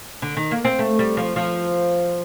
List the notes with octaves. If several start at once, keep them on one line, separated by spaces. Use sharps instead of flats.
D3
D#3
A#3
C4
A3
G3
F3
F3